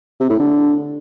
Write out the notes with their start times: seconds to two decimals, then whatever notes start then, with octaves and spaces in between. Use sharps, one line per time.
0.20 C3
0.30 A2
0.39 D3